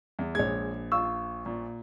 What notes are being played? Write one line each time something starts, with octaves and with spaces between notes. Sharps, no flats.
E2
A#1 G#3 C#5 G#6
F4 C#6 E6
A#2